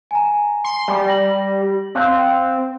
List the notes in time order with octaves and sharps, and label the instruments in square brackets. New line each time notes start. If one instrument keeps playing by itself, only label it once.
[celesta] G#5 A#5
[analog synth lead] C6
G3
[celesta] A#6 F#7
[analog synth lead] C4 [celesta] F5 F#6